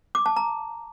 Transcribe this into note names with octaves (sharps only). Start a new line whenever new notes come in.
D6
A5
A#5